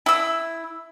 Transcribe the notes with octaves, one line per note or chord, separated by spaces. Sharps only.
E4 E6